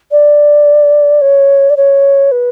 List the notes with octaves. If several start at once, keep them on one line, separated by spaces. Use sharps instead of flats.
D5
C#5
D5
C#5
B4